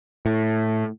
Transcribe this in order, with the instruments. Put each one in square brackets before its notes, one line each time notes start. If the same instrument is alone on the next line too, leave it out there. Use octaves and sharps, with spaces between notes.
[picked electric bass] A2